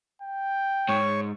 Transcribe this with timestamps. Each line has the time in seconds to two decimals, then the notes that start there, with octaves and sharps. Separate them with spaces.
0.22 G5
0.89 G#2 C#5 C#6